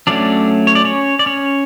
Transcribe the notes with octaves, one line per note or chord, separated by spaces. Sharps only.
F#3 A3 C#4 D4 D5
C#5
D5
C#4 C#5
D5
C#4 C#5